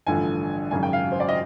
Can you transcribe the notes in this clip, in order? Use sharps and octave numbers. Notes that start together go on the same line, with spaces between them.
A1 G2 D3 F3 G#5
G#1 F#2 C#3 F#3 G#5
G5
F5
C5
D5
D#5